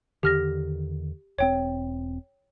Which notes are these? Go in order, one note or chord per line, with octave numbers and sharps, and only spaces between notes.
E2 D3 D#3 G4 F6 A#6
E1 C4 C#5 G5